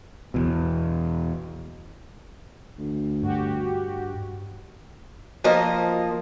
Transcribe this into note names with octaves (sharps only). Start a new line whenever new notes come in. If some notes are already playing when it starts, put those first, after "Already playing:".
E2 B2
D2
G2 F#4 G4
F3 A#3 D#5